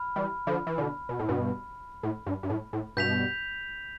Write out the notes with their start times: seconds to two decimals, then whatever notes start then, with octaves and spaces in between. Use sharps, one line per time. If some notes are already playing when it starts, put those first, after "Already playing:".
Already playing: B5 F6
0.16 E3 G3
0.47 D3 F3
0.67 E3
0.78 B2 D3
1.09 B2
1.19 A2
1.29 G2 B2
2.03 A2
2.26 G2
2.43 G2
2.50 A2
2.73 A2
2.97 G2 B2 G6 B6 F7